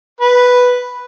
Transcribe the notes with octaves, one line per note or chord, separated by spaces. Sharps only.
B4